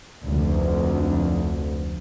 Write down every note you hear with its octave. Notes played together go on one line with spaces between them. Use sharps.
F1 D2